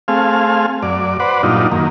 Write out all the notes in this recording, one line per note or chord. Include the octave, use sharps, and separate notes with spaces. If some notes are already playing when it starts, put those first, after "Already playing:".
A3 C4 G#4 F5
F#2 D5
B4 C5 D5 F#5
G2 A#2 F#3 D4 D#4 F4
F#2 D#3 A#3